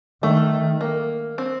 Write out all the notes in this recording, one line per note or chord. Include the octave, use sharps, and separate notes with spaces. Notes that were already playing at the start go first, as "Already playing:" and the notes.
D#3 A3
A#3
C4